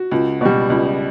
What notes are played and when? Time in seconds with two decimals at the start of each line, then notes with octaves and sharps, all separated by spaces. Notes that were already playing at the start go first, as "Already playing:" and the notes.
Already playing: F#4
0.11 C#2
0.41 B2 G3
0.70 C#2